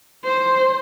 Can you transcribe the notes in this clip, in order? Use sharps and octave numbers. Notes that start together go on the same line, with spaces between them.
C5